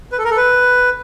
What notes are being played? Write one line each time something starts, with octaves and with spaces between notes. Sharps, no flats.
B4
A4
A#4
A4
B4